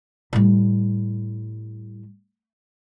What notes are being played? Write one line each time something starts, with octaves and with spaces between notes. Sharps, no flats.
A2 G3